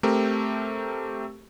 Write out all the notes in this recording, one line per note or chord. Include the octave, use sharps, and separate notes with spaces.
A3 C4 G4 A#4